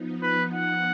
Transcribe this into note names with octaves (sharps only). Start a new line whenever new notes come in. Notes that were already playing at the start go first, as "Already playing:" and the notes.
Already playing: F3 B3 D#4
B4
F#5